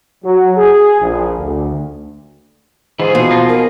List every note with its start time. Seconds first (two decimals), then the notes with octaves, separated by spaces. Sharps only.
0.24 F#3
0.57 G#4
1.01 A#1
1.38 D2
3.00 G#2 E3 F4 G#4
3.15 B2 F3
3.30 A#3 D#4 F4
3.49 G#4 A#4